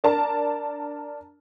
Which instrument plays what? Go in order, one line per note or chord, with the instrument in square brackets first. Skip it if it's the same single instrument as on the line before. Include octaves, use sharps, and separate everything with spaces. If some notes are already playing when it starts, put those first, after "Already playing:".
[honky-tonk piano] D4 A#4 A5